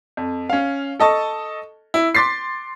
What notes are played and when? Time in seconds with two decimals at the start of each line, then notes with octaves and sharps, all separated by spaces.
0.17 F2
0.49 C#4 F5
1.00 A4 D#5 A5 C#6
1.94 E4
2.15 C6 D6 A6 B6 C7